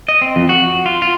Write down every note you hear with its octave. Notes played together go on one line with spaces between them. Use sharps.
D#5
C4
F2
F#4
F4
F4